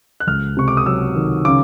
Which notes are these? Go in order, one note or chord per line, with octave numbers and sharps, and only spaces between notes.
F#6
C#2 F6
C3 C#6
D6
D#6
F#3 E6
D#3
C#3 D6